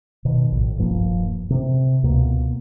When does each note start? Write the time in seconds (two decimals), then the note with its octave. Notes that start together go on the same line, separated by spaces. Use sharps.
0.25 B2 D#3
0.52 A#1 A2
0.78 D#1 G2 F3 A#3
1.50 C3
2.03 C#2 B2 A#3